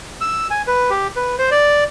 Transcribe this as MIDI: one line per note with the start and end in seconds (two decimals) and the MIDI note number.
0.21 0.47 88
0.50 0.62 80
0.67 0.90 71
0.90 1.07 67
1.16 1.36 71
1.38 1.50 72
1.51 1.84 74